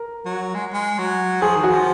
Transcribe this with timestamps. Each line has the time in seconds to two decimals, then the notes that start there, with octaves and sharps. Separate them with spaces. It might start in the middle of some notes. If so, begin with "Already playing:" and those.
Already playing: A#4
0.25 F#3
0.54 G#3
0.74 G#3
0.99 F#3
1.42 F3 G#4
1.56 D#3
1.63 F#4
1.70 F3